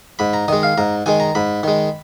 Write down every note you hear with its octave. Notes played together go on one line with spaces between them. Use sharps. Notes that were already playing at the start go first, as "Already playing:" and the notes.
G#2 B5
A#5
D#3 G#3 D#5
F5
G#2 A#5
D#3 G#3 G#5
A#5
G#2 B5
D#3 G#3